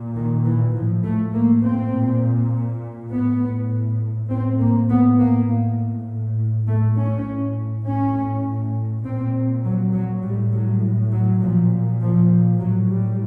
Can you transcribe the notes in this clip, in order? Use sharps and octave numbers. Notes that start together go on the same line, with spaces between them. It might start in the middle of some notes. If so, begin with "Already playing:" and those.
Already playing: A#2
D#3
E3
A2 F3
A3
A#3
C4
A#2
A2 B3
A2 C4
A#3
B3
A#3
A2
A2 A3
C#4
A2 C#4
A#2 C4
F#3
F#3
A2 G3
F#3
F#3
A#2 F3
F3
A2 F#3
G3